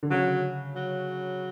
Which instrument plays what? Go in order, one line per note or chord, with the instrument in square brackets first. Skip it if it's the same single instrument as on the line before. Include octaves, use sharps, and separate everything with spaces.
[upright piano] D3
[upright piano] C#3 [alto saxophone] F#3
[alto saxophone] F#3